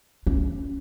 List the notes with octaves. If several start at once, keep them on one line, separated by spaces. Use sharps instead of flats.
C#4